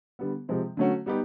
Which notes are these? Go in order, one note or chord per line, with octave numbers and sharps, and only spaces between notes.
D3 G3 B3
C3 F3 G#3 C4
D3 F#3 A3 C#4 F#4
G3 B3 D#4 G4